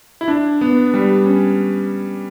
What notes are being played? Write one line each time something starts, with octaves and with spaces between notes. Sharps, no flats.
E4
D4
B3
G3
C#4